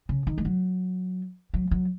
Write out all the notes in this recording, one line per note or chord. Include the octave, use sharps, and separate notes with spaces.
C#3
D#3
G#3
F#3
F#3
F#3